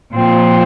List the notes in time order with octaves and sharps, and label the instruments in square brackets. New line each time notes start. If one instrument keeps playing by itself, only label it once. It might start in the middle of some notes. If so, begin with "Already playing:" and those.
[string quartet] A#2 F3 C4 F4